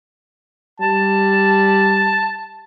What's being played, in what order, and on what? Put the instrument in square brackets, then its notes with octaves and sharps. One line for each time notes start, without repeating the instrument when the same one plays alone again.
[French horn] G3 [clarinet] A5